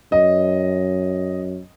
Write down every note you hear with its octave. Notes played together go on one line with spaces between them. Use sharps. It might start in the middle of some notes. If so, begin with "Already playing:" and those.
F#2 D#5